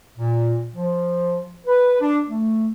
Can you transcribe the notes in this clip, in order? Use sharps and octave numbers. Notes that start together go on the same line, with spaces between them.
A#2
F3
B4
D4
A3